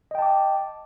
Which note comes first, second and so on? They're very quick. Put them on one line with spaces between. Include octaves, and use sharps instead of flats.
D#5 G5 A5 D6